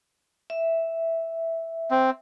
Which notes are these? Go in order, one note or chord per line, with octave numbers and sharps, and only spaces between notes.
E5
C4